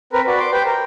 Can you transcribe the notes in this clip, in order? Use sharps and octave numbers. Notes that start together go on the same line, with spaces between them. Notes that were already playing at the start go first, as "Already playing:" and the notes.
C4 A#4 B4
F#4 B4 D5
C6 D6
G4 B4 C5 G5
A#4